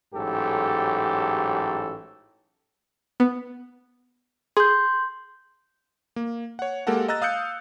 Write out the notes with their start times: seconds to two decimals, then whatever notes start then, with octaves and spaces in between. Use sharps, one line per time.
0.14 A1 G#2 F#3 G4 A4
3.20 B3
4.57 G#4 C6 G6
6.16 A#3
6.59 C#5 F#5
6.87 G#3 A#3 G4 A4 A#4 F#5
7.08 D#5 A#5 E6 F#6 A6
7.22 F5 D#6 E6 F#6 G6 C#7